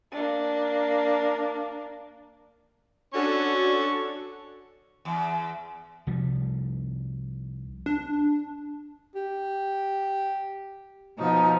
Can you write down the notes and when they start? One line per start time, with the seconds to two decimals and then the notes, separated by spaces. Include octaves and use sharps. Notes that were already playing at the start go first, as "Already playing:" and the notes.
0.11 A#3 D4
3.14 C#4 D4 F#4 A4 C#6
5.05 E2
6.07 C2 F3 G3
7.86 D4
9.15 G4
11.19 B2 F3 D#4